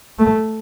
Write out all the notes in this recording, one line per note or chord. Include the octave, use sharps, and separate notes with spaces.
A3